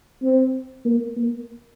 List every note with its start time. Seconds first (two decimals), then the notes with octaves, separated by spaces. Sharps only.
0.22 C4
0.85 A#3
1.16 A#3